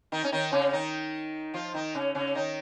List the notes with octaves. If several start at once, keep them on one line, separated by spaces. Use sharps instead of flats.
D#3 D#4
C#4
D#3 D#4
C#3 C#4
C#4
D#3 D#4
F3 F4
D#3 D#4
C#3 C#4
C#3 C#4
D#3 D#4